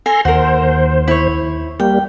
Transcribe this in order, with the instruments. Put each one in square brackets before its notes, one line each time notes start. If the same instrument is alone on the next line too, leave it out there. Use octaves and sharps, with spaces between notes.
[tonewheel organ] A4 A#5 C6 [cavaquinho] G#5
[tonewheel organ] D#2 C5 [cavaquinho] F#4 A#4
[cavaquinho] E4 C#5
[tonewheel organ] G3 A#3 [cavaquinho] G5